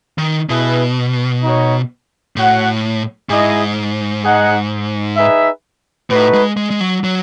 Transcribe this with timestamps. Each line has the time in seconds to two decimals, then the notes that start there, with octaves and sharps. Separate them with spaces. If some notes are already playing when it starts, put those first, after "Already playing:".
0.18 D#3
0.49 B2 E4 G#4 B4
1.43 D#4 F#4 C#5
2.36 A2 F#4 C#5 F#5
3.29 G#2 E4 G#4 D#5
4.24 D#4 G#4 D#5 F#5
5.17 D#4 G#4 B4 E5
6.10 A2 A3 D#4 F#4 B4
6.34 G#3
6.57 G#3
6.70 G#3
6.80 F#3
7.04 F#3